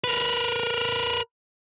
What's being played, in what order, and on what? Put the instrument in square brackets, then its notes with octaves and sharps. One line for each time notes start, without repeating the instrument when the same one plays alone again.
[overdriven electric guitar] A#4 B4